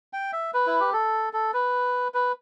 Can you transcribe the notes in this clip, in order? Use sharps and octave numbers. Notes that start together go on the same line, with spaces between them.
G5
E5
B4
E4
G4
A4
A4
B4
B4